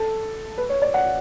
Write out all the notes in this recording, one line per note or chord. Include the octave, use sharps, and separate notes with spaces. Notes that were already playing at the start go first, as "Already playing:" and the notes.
Already playing: A4
B4
C#5
D5
F#5